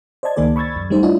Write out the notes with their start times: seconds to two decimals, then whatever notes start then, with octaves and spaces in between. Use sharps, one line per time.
0.23 C5 D5 D#5 A5 G#6
0.36 C#2 D#3 A#3 G#4 D5
0.56 B5 C#6 E6 G#6 A6
0.76 F#2
0.90 G3 A3 D#4 C5
1.03 D4 E4 F4 C#5 D#5